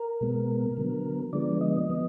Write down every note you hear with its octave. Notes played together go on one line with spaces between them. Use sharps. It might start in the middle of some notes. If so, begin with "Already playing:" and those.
Already playing: A#4
B2 G#3 B3
D3 F#3 B3
D3 F3 G#3 B3 D5
D#5
F3 B3